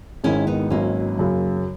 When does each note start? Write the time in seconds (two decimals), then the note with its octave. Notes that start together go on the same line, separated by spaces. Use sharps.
0.24 G#1 G#2 D#3 G#3 C#4 E4
0.47 B3 D#4
0.70 G#1 G#2 F#3 A#3 C#4
1.19 F#2 C#3 F#3